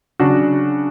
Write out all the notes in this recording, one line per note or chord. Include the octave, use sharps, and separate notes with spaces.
C#3 F#3 D4 F#4